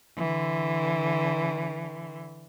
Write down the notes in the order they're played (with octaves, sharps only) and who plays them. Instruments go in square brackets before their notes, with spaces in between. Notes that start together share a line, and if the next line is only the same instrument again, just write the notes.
[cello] D3 E3